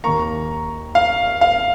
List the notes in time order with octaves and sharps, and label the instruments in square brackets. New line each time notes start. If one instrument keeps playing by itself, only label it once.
[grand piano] D#2 D#3 A#3 A#5 C#6
F5
F5